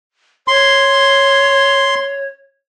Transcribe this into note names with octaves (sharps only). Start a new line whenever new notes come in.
C#5 C6